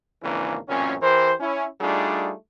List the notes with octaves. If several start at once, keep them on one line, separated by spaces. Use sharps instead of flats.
G#1 C#3 E3 A#3 C4 D4
A1 F#2 A#2 C4 C#4
E3 G4 A#4 C5
C#4 E4
G3 A3 D4 D#4 F4 G#4